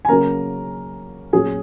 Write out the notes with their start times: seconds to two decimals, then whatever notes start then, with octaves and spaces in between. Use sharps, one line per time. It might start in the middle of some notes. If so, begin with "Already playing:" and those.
0.05 G#5
0.09 C#3 F#3 A#3 C#4 A#4 A#5
1.33 A#2 F#3 C#4 G#4 G#5